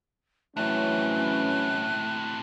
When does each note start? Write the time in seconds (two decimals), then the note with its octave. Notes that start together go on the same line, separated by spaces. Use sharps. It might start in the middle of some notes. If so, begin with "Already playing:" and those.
0.57 A2 E3 F#3 A3 C4 C#4 F#6